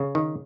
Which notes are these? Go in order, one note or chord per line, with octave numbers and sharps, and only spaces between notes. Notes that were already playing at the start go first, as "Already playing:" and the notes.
Already playing: C#3
D#3